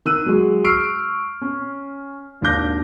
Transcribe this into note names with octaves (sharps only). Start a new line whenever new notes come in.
D#3 E6 F#6 D#7
F#3 G#3
C#6 E6 F6 C7 D7
C#4
G#1 D#2 D4 D6 G6 A#6